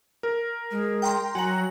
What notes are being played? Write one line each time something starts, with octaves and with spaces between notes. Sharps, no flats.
A#4
G#3
G5 A#5 C6
F#3 F#4 G#5 A#5 F#7